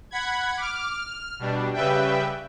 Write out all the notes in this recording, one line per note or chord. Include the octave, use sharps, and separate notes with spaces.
F#5 B5 G#6
D6 F6
F6
B2 G3 D4
C#3 G3 B4 E5 G5